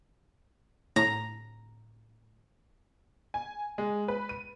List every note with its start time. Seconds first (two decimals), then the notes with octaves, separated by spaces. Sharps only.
0.96 A2 A#5
3.34 G#5
3.78 G#3
4.08 B4
4.29 D#7